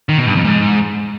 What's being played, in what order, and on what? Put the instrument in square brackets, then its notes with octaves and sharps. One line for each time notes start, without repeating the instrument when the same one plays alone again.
[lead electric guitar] D#3
B2
G2
F2
G#2